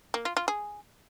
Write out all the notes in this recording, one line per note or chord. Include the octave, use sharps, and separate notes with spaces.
A#3
F4
F4
G#4